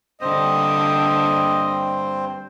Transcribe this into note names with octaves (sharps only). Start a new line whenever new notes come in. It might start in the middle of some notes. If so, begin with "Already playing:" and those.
G2 D3 A#3 C4 C5 D#5